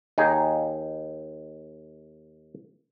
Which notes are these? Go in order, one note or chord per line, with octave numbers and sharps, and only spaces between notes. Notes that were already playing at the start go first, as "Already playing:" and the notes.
D#2 D#4 G#4